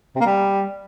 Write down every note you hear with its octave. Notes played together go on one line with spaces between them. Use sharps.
C3
A#3
G3